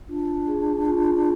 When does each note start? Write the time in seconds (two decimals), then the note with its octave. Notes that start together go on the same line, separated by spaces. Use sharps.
0.08 D4 F4
0.48 G#4
0.88 F4